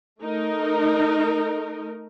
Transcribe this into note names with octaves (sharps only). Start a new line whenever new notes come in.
A3 D#4 A#4